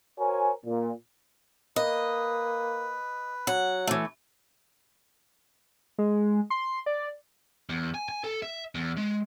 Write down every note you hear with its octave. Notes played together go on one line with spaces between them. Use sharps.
F#4 A#4 C5 C#5 G#5
A#2
A#3 B4 D#5
F#3 F#5
E3 A3
G#3
C6
D5
E2
G#5
G#5
A4
E5
E2
G#3